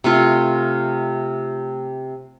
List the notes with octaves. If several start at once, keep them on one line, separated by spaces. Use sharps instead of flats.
C3 A3 F4